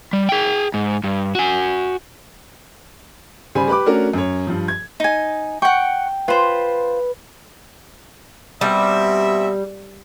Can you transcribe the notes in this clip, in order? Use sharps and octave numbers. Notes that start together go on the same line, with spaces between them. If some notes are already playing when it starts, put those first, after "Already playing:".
G3
G#4 G5
G#2
G2
F#4 G#5
C#3 G3 C5 G#5 B5
G4 B4 B5 D6
A3 C#4 D4 F#4 A#4
F#2 C#5
G2 F3
G#6
D#4 G#5
F#5 G5 C#6
F4 B4 C5
B2 G3 C4 E5